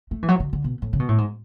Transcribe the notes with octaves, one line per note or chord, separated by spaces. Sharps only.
A3
E3
F#3
D3
D3
B2
A2
C#3
B2
A2
G#2